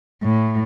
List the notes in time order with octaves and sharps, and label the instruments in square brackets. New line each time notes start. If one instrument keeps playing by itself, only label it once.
[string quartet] A2